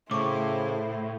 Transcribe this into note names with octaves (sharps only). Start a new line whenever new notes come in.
A2 C#3 E4 C5 C#6 D6